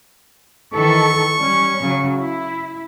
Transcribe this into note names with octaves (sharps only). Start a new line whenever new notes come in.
D#3 E3 A4 C#6
G3 C#4
C#3 F#3
E4